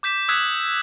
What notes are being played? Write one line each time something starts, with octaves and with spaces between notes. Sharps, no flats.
D6 G6 B6 E7
D#6 E6 F#6 G#6 B6 E7